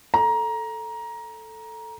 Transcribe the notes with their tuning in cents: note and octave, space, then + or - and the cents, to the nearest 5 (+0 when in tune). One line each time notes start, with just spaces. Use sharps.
A4 +0 A#5 +15